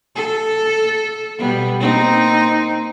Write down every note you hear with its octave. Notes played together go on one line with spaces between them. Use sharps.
A4
B2 G3 B3
A#3 C4 D#4